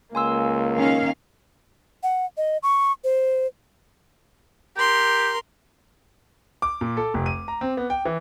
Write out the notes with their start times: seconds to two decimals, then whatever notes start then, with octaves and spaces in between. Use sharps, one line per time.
0.15 C#2 A#3 G#5 C6 E6
0.74 D#3 C#4 F5
2.03 F#5
2.37 D#5
2.63 C#6
3.04 C5
4.77 G4 A#4 C6
6.62 D6
6.81 A#2
6.97 A4
7.14 F1
7.26 D#7
7.48 A#5
7.61 C4
7.77 B3
7.90 G5
8.05 E3